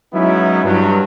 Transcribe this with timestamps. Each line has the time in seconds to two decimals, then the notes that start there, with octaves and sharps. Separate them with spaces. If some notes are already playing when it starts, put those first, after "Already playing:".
0.13 F#3 G#3 B3 C#4 D#4 E4
0.64 G2 F#3